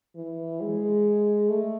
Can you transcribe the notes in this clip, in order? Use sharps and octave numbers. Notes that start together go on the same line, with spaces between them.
E3
G#3
A3